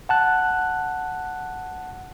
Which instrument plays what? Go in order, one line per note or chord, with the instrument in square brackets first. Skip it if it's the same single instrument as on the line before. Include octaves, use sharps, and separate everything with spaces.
[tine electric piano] F#5 A5 F#6